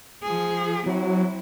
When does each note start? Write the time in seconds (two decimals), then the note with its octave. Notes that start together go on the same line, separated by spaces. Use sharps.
0.23 F3 G#4
0.86 F#3 C4 E4